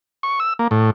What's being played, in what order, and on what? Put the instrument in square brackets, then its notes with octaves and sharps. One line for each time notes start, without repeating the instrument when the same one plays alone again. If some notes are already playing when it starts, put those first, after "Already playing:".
[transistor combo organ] C#6
E6
A#3
A2